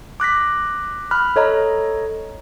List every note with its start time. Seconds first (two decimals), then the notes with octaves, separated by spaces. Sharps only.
0.20 D6 F#6 A#6 B6
1.11 B5 F6 F#6
1.36 A4 C#5 D#5 A#5